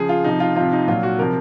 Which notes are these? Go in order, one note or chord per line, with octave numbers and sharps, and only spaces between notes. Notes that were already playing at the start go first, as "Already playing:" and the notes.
Already playing: C#3 F3 G#4
F4
C3 F3 D#4
F4
C3 F3 F4
D#4
A#2 F#3 F4
F#4
C3 F3 A#4